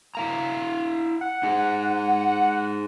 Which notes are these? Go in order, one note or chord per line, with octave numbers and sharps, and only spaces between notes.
E4 F5 A#5
F#5
D#4 G#4